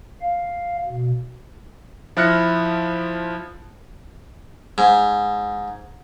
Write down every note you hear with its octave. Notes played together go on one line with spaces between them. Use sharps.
F5
B2
F3 E4 F6 F#6 A#6 C#7
G#2